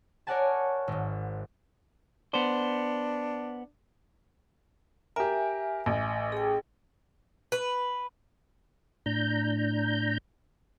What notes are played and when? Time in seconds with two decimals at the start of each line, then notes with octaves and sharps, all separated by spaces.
0.27 A#4 C#5 D5 F#5 G#5 A5
0.88 G#1 G#2
2.34 B3 D4 C5
5.16 G4 A#4 E5 G#5
5.86 A1
6.32 G#4 G5
7.52 B4
9.06 A2 D4 A#5 G6